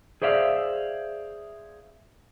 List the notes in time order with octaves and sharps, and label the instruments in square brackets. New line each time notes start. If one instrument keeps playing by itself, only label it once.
[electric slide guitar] G#4 C5 D5 E5 F5